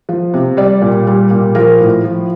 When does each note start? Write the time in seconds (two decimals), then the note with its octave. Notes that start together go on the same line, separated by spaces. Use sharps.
0.09 F3
0.34 C3
0.57 G3 D5
0.81 A#2
1.07 G3
1.31 A#2
1.55 F3 A#4
1.80 A2
2.04 F3